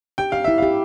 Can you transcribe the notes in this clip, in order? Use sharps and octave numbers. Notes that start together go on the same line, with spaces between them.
G4 G5
G4 F5
E4 E5
G4 F5